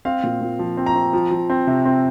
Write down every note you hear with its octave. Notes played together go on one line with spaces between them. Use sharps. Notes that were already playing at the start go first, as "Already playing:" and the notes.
C4 F5
A#2
A#2
F3
C4
A#5
C4
F3
F3
C4
C3
C4